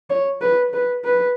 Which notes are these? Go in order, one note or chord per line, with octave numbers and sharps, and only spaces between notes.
C#5
B4
B4
B4